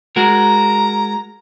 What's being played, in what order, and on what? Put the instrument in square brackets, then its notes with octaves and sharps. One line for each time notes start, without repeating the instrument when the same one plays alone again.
[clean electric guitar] G#3 F#4 A#4 [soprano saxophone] A#5